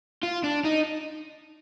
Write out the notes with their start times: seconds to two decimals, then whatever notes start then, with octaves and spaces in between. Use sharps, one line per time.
0.23 F4
0.43 D4
0.64 D#4